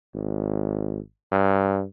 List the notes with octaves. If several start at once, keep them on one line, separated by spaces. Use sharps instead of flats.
G#1
G2